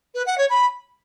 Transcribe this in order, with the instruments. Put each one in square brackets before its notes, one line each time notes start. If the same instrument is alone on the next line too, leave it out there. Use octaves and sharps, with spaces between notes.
[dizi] B4
F#5
C#5
B5